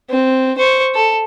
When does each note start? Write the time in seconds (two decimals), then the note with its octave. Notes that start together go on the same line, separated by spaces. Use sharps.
0.10 C4
0.58 C5 C#6
0.95 A4